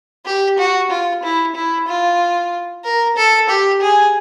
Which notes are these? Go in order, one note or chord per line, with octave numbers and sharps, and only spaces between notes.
G4
F#4
F4
E4
E4
F4
A#4
A4
G4
G#4